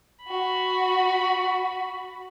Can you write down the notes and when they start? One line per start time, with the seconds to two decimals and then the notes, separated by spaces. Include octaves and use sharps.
0.25 F#4 B5